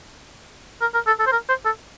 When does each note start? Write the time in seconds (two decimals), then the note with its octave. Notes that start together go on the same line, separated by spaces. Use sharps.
0.81 A#4
0.94 A#4
1.07 A4
1.20 A4
1.27 C5
1.32 A#4
1.49 C5
1.65 A4